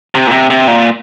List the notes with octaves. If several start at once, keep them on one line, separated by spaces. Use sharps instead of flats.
C3
A#2
C3
C3
A#2